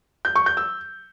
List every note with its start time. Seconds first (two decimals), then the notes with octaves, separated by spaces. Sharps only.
0.25 G6
0.36 C#6
0.46 G6
0.57 E6